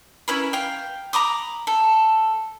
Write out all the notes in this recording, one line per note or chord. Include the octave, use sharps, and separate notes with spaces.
C#4 E4 A#4 B4
F5 G5
A#5 B5 D6 D#6
A4